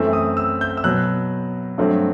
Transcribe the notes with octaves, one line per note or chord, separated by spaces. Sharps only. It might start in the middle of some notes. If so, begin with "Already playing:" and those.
Already playing: F#2 E3 A3 C4 E6
D#6
E6
G6
E6
B2 F#3 B3 F#6
G2 F#3 A3 C4